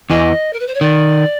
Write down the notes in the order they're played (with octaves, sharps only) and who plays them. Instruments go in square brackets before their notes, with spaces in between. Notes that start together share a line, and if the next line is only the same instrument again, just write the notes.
[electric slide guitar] E2 E3 [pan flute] D#5
[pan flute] A#4
B4
C5
C#5
[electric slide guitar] D#3 [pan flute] D5